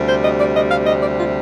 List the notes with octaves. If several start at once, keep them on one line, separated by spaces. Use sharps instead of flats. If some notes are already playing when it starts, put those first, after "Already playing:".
Already playing: D2 C3 G3
C5
D#5
D5
D#5
F5
D#5
D5
F4